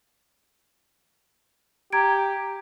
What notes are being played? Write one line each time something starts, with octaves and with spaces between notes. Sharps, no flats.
G4 A#5 G#6 D7